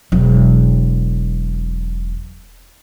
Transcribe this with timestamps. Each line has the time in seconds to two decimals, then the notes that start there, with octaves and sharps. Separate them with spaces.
0.12 E1 F#3